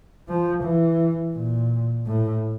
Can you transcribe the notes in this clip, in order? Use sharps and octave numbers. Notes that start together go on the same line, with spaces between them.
F3
E3
A#2
A2